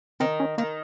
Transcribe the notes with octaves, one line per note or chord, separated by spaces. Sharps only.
D#3 C4
C#4
D#3 A#3